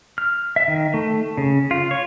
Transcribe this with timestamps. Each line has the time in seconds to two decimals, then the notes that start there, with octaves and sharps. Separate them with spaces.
0.18 F6
0.56 E5
0.68 D#3
0.94 A3
1.37 C#3
1.71 F4
1.91 C#5